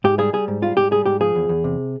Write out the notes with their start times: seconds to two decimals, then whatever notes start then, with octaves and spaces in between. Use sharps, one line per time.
0.04 G#2 G4
0.18 G3 G#4
0.33 G3 G#4
0.48 G#2
0.62 G3 F4
0.77 G#2 G4
0.91 G3 G#4
1.06 G#2 G4
1.21 F3 G#4
1.35 E2
1.49 E2
1.64 C3